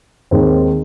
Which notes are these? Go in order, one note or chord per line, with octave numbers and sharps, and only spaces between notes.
D#2 D#3 G#3 C4